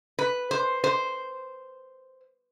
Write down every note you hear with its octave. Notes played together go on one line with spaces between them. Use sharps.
B4
C5
C5